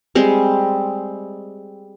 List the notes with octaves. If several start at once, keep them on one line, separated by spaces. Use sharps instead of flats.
G3 G#3 C4